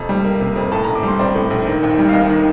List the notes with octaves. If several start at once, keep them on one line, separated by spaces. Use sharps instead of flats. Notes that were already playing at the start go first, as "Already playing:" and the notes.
Already playing: F2 C3 A5
G3
A#3
C3
F2
A2 A5
A#5
A#1
D6
G3 C6
C4 D5
A2
A#1
D#3
D#2
G3
F5
D#2 D#5
D#3